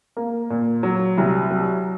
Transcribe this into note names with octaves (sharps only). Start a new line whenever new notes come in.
A#3
A#2
F#3
C2
F#3